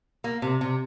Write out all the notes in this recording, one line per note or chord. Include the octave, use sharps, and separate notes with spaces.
A#3
C3
C3